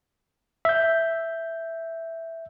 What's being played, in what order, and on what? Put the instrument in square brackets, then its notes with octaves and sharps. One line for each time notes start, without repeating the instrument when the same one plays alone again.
[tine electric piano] E5 G6